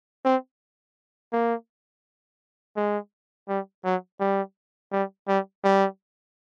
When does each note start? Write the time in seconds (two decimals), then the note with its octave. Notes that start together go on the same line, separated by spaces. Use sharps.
0.25 C4
1.32 A#3
2.77 G#3
3.49 G3
3.84 F#3
4.20 G3
4.92 G3
5.28 G3
5.64 G3